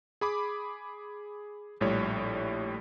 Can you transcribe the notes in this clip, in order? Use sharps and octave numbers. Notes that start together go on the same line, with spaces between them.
G#4 B5 D6
A#1 A2 G3 C#5